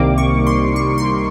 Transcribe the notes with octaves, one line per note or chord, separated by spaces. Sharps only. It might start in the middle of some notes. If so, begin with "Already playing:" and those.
Already playing: C2 C3 D#3 G3 A#3 D6
C#6
C6
C#6
C6